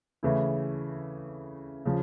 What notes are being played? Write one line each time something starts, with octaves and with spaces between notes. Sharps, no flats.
C#3 E3 A3 E4
C#3 F3